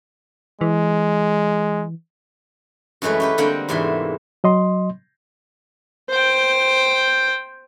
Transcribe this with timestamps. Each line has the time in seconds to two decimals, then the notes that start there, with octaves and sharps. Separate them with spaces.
0.61 E3 G#3
3.02 F#2 E3 G#3 A3 C#4 B4
3.20 C#4 G4 B4
3.38 D3 G3 A#3 C4 F#5 G5
3.69 E2 G#2 C3 E3 E5 C6
4.44 F#3 D#5 C6
6.10 C5 G5